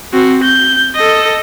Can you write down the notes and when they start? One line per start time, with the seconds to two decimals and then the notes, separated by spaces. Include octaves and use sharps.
0.13 C4 F#4
0.43 G6
0.96 A4 D#5